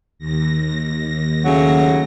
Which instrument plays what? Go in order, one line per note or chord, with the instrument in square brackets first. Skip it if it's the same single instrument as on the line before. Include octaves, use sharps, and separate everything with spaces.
[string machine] D#2 A#6
[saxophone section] C#3 F#3 A3